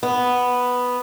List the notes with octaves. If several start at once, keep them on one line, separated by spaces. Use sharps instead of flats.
B3